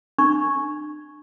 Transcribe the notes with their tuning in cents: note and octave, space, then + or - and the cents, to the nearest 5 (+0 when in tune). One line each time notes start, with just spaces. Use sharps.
D4 +40 C#6 -5